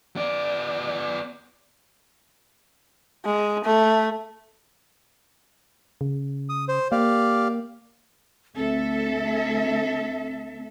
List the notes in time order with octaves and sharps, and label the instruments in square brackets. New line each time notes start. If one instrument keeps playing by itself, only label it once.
[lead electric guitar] B3 D5
[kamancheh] G#3
A3
[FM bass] C#3
[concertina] D#6
C5
[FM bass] A#3 [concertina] G4 D5 F5
[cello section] D2 A4 E5 [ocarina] C4